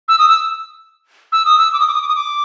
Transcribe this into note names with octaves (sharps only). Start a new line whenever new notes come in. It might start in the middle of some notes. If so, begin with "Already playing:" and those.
E6
D#6
E6
E6
D#6
E6
D6
D#6
D6
D#6
D6
D#6
D6